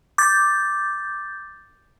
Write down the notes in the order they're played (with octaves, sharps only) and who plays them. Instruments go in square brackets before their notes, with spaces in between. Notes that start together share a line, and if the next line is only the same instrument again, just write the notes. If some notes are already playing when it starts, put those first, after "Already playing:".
[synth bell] D6 G6 A6